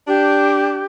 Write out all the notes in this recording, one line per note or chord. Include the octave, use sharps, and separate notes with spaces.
D4 G4